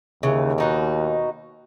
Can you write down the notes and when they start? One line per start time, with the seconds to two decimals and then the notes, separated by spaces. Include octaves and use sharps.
0.23 D#2 C#3 E3
0.58 B2 D#4 F#4